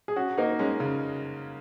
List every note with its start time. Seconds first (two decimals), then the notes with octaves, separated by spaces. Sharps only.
0.08 G#4
0.16 C#4 F#4
0.38 A#3 D#4
0.59 G#3 C#4
0.80 C#3